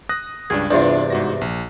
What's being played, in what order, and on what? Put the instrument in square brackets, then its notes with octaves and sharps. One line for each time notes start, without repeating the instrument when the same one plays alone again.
[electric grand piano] D#6 F#6 A#6
[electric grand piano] C#2 G2 D4 [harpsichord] G#4
[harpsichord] E2 G2 C3 [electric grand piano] D4 F4
[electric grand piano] G#2 F#4 A#6
A#1